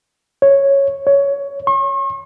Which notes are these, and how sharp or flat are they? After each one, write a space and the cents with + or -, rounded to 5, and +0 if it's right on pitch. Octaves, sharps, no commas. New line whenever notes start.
C#5 -5
C#5 +15
C#6 -45